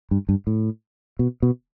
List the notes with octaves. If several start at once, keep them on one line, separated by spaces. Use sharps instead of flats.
G2
G2
A2
B2
B2